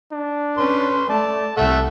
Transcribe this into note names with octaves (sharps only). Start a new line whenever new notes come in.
D4
C#4 B4 C6
A3 D5 A5
C2 A3 A4 E5 F#5